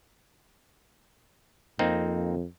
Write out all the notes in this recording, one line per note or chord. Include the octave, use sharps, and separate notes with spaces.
F2 A#3 C4 D#4